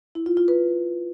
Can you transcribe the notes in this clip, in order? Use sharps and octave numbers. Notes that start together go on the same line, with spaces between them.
E4
F4
F4
B4